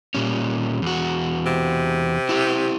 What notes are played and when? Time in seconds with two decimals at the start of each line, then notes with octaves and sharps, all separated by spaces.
0.15 A#2 G3 C#4
0.82 E2 F#4
1.46 C3
2.29 E4 G4